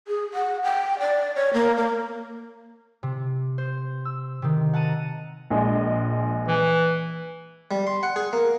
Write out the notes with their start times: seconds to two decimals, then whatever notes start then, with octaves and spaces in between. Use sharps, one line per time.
0.08 G#4
0.34 F#5
0.64 G5
1.00 D5
1.36 C#5
1.54 A#3
1.77 A#3
3.03 C3
3.58 C5
4.05 E6
4.42 C3 D#3
4.74 F#5 A5 A#5 D#7
5.50 A#1 G#3 D#5
6.48 E3
7.71 G3
7.87 C6
8.03 F#5
8.16 G#4
8.33 A#3